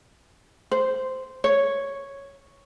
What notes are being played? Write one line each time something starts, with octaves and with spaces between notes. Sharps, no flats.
C5
C#5